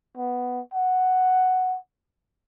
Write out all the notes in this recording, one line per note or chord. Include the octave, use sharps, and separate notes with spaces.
B3
F#5